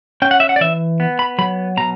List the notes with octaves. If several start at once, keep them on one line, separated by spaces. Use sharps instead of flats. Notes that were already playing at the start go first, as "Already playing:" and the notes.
C#4 G5
F#5
E5
F#5
D5
E3 E5
B3
B5
F#3 B5
B2 A#5